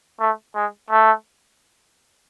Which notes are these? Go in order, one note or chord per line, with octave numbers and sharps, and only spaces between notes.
A3
G#3
A3